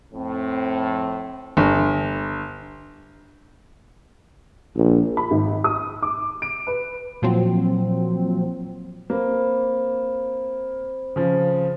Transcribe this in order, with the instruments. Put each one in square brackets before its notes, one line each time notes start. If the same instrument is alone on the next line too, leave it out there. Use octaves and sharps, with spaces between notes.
[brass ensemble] F2 A2 C4
[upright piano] G1
[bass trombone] A#1
[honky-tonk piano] B5
G#1
D#6
D6
D7
B4
[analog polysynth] A#2 F3 F#3 C4
[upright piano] A#3 [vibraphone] C4 C5 B5
[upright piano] C#3 F3